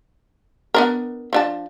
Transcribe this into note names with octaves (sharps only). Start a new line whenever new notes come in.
B3 D4 A#4
F3 D4 A5